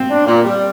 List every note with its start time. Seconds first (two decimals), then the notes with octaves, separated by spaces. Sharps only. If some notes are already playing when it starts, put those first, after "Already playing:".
Already playing: C4
0.09 D4
0.26 A#2
0.45 G3